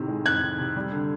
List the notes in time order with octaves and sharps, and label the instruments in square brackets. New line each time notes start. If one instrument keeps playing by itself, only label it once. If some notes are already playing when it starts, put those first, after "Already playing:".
Already playing: [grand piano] A2 C3 D#3
G#3
[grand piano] F2 [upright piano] F#6 G#6
[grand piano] D#3
C3
G3
D3